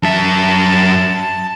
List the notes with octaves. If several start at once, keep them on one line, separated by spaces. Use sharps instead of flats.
F#2 E5 A5